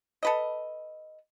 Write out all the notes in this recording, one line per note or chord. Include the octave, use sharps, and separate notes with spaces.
A4 B4 D#5